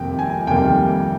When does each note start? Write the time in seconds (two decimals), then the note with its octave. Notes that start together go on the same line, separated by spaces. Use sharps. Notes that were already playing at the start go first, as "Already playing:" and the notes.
Already playing: F2 C3 D#3 G3 A#3 G5
0.19 G#5
0.47 F2 C3 D#3 G3 A#3 G5